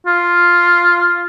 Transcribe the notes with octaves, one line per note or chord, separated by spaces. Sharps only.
F4